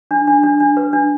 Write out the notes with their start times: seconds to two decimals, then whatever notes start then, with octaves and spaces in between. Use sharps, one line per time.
0.11 D4
0.27 D4
0.43 D4
0.60 D4
0.77 B4
0.93 D4